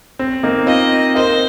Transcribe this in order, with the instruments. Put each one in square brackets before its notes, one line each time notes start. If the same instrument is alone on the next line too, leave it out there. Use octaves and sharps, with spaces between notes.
[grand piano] C4
A#3 D#4
[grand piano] C4 F4 [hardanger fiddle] D#5
[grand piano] A#4 D#5 [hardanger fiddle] C5